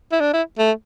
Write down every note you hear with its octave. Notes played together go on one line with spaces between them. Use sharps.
E4
D4
E4
A3